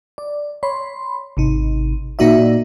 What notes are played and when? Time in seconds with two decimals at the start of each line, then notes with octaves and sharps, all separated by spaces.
0.18 D5
0.63 C#5 B5 C6
1.37 G#1 C3 D#4
2.19 A#2 A#3 D#4 F#4 D5 E5